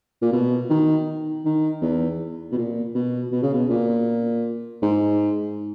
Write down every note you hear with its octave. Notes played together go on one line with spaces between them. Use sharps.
A#2
B2
D#3
D#3
E2
B2
A#2
B2
B2
C#3
B2
A#2
G#2